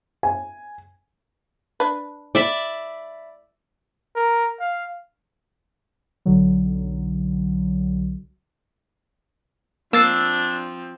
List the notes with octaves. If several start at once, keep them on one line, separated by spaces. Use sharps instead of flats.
G#5
D4 B4
D5 E5 B5
A#4
F5
B1 D3 F#3
F3 A#3 C4 D4 E6 A6 C7